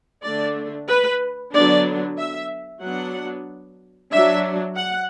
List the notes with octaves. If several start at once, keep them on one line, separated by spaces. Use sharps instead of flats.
D3 A3 D4 D5
B4
D3 F#3 B3 D4 D5
E5
F#3 B3 D4 F#5
F#3 D4 E5
F#5